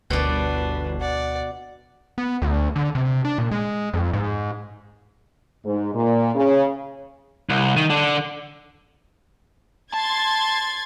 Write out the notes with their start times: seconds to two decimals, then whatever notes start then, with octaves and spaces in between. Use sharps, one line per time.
0.10 G1 D2 B2 D4 B4 D5
1.00 D5 F#5
2.18 B3
2.42 D2
2.76 D3
2.95 C3
3.25 D4
3.38 A#2
3.51 G#3
3.94 F2
4.13 G#2
5.65 G#2
5.94 A#2
6.35 C#3
7.49 C2
7.77 D#3
7.90 D3 D4
9.94 A5 C6 G#6 A6